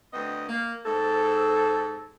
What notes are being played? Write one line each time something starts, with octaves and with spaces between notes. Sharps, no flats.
D2 B3 C4 D#5
A#3
G#2 C4 A4